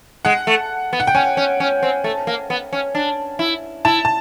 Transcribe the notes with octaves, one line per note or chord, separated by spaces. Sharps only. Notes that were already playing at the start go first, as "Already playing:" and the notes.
G#3 F#5
A3
B3
F#5
G5
C#4 G#5
C#4
C#4
C4
A3
A#3
B3
C#4
D4
E4
E4 A5
A5